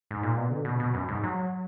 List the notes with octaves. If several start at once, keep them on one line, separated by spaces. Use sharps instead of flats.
G#2
A#2
B2
D3
B2
B2
F#2
G#2
F#3